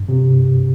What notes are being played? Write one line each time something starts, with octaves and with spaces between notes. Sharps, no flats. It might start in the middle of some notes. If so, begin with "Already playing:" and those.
Already playing: G2
C3